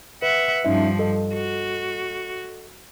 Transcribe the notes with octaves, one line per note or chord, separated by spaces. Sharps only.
B4 E5 F#5
G2 F3 C#4 D#4 E5
A4 D#5
F#4